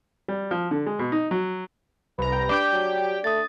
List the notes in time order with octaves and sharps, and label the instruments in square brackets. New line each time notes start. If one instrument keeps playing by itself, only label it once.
[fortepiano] G3
F3
D3
G#3
B2
D#4
F#3
[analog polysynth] C2 A#5 [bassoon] B4
[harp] G5
[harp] D4 D6 G6 [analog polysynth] G4 G5 [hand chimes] D5
[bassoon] F#3
[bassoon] A3 [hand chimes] D#6 A6